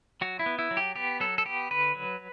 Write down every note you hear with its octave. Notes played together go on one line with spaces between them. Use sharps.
F#3 F#4
E4
B3
E4
F#3
G4
B3 G4
F#3 A4
A4
B3 G4
D3 B4
F#3